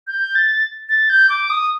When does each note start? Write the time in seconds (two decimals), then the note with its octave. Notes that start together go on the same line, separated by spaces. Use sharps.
0.07 G6
0.35 A6
0.89 A6
1.10 G6
1.30 D6
1.50 D#6